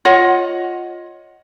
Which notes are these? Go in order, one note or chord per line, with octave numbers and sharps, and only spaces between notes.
F4 C#5 D#5 F#5